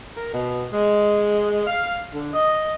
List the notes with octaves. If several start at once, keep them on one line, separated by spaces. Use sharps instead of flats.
A#4
B2
G#3
F5
D3
D#5